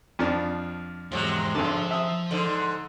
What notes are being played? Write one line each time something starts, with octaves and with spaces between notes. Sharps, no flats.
F2 F3 D4
E2 G#2 C3 F#3 G#3
G#1 D3 F3 A5
E5 D#6
G#2 D3